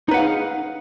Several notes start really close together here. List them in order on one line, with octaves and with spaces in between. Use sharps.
D#4 B4 F#5 F5 G#4